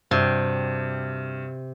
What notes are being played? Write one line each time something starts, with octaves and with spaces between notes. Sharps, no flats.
G2 C3 F#4